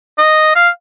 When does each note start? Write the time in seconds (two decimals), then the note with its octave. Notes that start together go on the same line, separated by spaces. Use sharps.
0.18 D#5
0.55 F5